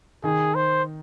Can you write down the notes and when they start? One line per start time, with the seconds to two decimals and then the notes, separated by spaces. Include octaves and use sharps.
0.24 D#3 D#4 G#4
0.55 C5